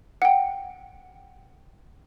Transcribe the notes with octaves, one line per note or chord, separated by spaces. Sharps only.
F#5 G5